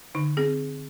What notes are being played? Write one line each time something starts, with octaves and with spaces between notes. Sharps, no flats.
D3 D#4
C4 G#4